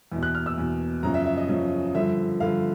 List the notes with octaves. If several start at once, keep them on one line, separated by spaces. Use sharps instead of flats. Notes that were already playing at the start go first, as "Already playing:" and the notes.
E2 B2
F#6
F6
E6
E2 B2
F#2 C#3 F3 A#5
E5
E5
D#5
F#2 C#3 F3
G2 D3 F3 E5
G2 D3 F3 F5